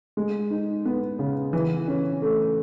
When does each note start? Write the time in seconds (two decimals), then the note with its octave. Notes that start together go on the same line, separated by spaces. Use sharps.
0.17 G#3
0.50 D#4
0.85 B3
1.19 C#3
1.53 E3
1.88 C#4
2.22 A3